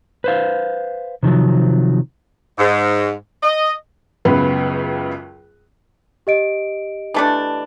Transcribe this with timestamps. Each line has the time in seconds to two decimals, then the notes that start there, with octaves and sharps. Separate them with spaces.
0.24 B4 C5 F5
1.23 C3 D#3 F3 F#3
2.57 G#2
3.43 D#5
4.25 C#2 F#2 C#3 B3 B4
6.27 G4 D#5 D7
7.14 E3 A3 D4